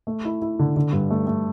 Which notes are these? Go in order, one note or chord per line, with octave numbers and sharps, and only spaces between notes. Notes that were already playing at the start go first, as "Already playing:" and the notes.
A3
E4
E4
D3
D3
G2
A3
A3